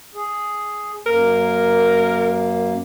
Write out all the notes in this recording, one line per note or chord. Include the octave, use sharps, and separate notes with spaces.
G#4
F#2 A#3 A#4